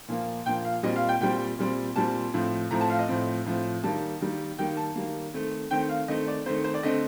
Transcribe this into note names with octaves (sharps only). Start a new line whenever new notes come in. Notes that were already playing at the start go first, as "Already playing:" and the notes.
A#2 F3 A#3
A#2 F3 A#3 G5
F5
A#2 G3 C4 D#5
F5
G5
A#2 G3 C4 G5
A#2 G3 C4
A#2 G3 C4 A5
A2 F3 C4
A2 F3 C4 A#5
A5
F5
D#5
A2 F3 C4
A2 F3 C4
D#3 G3 A#3 A5
D#3 G3 A#3
D#3 G3 A#3 G5
A5
D#3 G3 A#3
D#3 A3 C4
D#3 A3 C4 G5
F5
D#3 A3 C4 D#5
D5
D#3 A3 C4 C5
C5
D5
D3 A3 C4 D#5